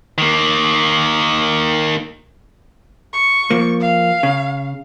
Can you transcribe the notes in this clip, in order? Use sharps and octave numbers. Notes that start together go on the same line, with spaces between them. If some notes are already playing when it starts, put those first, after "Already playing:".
D#3 A#3
C#6
F3 A#3
F5
C#3